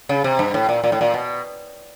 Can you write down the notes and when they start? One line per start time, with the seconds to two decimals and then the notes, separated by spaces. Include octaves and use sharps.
0.09 C#3
0.24 C3
0.39 G2
0.54 A2
0.69 A#2
0.84 A#2
0.92 A2
1.01 A#2
1.14 B2